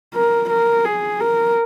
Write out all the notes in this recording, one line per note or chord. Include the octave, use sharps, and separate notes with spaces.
A#4
A#4
G#4
A#4